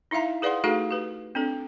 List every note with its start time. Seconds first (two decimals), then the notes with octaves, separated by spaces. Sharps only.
0.11 D#4 E4 E5 F5 A#5
0.42 G#4 B4 D5 F5 F#5 C6
0.64 A3 D#4 F#4 G#4 A4 F5
0.91 G4 B4
1.35 C4 D4 A4